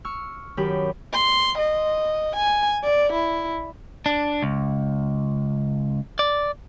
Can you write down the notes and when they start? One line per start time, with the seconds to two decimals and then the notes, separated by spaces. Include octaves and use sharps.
0.05 C#6 E6 F6
0.57 F#2 D#3 G4 B5
1.14 C6
1.58 D#5
2.36 G#5
2.84 D5
3.13 E4
4.06 D4
4.43 C#2
6.19 D5